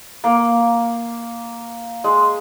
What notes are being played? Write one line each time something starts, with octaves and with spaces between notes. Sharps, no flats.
A#3
G#3